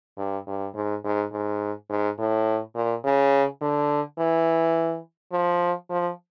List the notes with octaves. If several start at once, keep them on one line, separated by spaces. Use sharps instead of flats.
G2
G2
G#2
G#2
G#2
G#2
A2
A#2
C#3
D3
E3
F3
F3